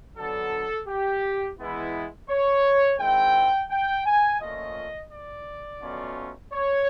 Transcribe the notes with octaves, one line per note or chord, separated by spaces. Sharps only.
D3 F#3 B3 D4 A4
G4
E3 G#3 B3 E4
C#5
D#3 G#3 C4 E4 G5
G5
G#5
A#2 F3 A3 C#4 F4 D#5
D5
B2 F#3 A3 C#4 F4
C#5